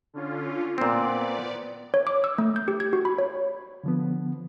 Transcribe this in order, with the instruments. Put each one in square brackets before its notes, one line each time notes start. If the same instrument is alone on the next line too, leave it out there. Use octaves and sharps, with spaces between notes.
[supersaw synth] D3 C#4 F4
[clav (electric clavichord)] A#2 C4 [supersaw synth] B3 D5
[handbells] C#5
D6
E6
A3
G6
G4
G#6
F#4
B5
C#5
[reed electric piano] D3 F3 B3